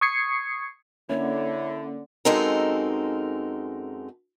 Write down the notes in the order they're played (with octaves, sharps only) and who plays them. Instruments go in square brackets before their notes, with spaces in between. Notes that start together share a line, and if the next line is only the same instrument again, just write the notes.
[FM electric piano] C#6 D#6 G#6 C7 C#7
[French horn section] D3 [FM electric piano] A#3 C#4 [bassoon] E4 [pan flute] C#5
[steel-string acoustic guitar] F#2 G#3 C4 D#4 A4 A#4